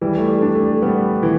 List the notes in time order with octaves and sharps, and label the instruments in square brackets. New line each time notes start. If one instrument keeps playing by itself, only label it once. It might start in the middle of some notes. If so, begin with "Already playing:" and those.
[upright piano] E3 [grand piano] G3
[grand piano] A3
G3
[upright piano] D4
[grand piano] A3
[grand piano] G3 [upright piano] B3
[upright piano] E3 [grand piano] G3